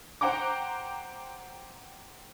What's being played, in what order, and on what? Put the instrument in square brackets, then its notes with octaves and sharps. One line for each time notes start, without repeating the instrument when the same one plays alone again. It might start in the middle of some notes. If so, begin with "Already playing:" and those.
[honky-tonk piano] C5 F#5 G5 A#5 D6